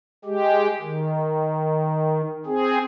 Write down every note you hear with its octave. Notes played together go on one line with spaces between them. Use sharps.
G#3 G4
D#3
C4 G#4